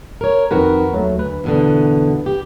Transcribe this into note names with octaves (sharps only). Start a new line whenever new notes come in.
A#4 C#5
F2 D#3 F#4 A#4 B4
D#2 F#3 A3
D2 B4
E2 B2 D3
G4